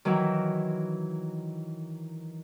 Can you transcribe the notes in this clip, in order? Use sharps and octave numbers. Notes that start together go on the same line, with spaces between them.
D#3 E3 F#3 E4